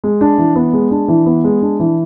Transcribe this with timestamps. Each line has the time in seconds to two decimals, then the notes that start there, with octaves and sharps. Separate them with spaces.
0.04 G#3
0.21 D4
0.38 E3
0.56 B3
0.73 G#3
0.91 D4
1.08 E3
1.26 B3
1.44 G#3
1.62 D4
1.80 E3